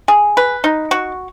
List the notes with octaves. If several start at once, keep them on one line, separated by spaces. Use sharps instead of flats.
G#4
B4
D#4
F#4